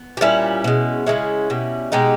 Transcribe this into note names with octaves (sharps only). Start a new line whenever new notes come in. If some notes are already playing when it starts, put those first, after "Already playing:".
Already playing: B3
G4
A#2 G3 C#4 E4
B2 G#3
C#3 E3 G#3 C#4 E4
B2 G3
B2 G#3 D#4 G4